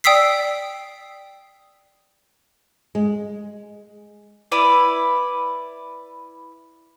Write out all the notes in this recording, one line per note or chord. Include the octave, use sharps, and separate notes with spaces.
D5 G5 D#6 E6 B6 C7
G#3
E4 B4 D5